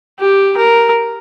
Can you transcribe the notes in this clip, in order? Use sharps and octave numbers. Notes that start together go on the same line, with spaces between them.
G4
A#4